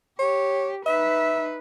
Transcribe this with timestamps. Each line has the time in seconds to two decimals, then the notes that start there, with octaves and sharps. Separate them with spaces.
0.19 G4 C#5
0.86 D#4 B4 E5